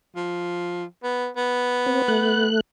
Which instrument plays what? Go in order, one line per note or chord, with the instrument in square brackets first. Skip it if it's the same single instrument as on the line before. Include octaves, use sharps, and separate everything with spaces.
[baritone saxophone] F3
B3
B3
[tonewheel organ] C4
A3 F#6